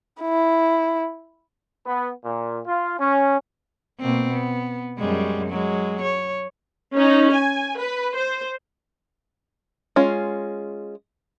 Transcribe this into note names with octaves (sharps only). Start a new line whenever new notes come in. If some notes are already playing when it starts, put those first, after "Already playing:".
E4
B3
A#2
F4
C#4
B2 A#3 C4
B3
F#2 G3 G#3
F#3 G#3
C#5
C#4 D#4
G#5
B4
C5
G#3 C#4 F4